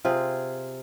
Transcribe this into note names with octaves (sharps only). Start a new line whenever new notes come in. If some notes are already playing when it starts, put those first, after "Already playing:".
C3 F4 G#4